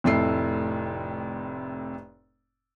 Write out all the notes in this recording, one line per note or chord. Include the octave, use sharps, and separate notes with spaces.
F1 F2 A2 E4 A4 C7